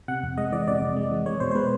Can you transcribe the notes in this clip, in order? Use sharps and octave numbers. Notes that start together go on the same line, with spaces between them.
C3 F#5
F2
G#3 D#5
E3 D5
C3 D5
F2
G#3
E3
G#3 C#5
B2 C5
C5
G#3 B4